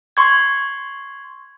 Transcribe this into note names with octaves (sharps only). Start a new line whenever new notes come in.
C6 C#6 G#6